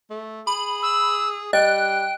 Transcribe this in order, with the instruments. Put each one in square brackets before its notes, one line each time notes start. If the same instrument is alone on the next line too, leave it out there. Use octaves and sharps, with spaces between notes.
[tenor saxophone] A3
[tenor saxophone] G#4 [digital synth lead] B5
[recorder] E6
[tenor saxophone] G3 [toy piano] D#5 [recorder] G5 [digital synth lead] F#6